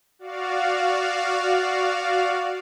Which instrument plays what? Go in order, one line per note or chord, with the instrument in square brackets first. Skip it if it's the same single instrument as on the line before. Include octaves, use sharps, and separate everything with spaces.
[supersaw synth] F#4 D5 F5